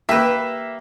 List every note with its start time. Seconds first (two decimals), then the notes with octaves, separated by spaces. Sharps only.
0.09 A#3 G4 B4 E5